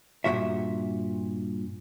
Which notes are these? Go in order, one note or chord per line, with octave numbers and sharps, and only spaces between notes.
G2 A#2 F3 F#3 F#4 E5